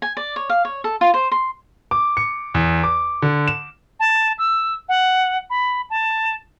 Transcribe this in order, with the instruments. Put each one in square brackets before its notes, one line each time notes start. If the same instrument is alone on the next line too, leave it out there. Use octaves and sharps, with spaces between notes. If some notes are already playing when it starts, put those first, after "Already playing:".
[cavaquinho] G#5
D5
C#5
F5
C#5
A4
F4
C5
C6
[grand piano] D6
C#7
E2
D6
D3
E7
[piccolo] A5
E6
F#5
B5
A5